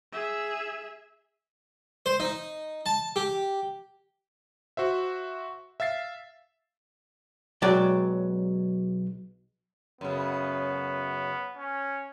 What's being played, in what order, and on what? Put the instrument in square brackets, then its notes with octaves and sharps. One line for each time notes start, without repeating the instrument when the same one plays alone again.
[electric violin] G#4 E5
[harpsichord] C5
D#4
A5
G4
[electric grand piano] F#4 C5 E5
E5 F5 A6 C7
[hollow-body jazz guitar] B1 F#3 G#3 D5 G5
[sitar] F#2 C#3 [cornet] B3
[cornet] C#4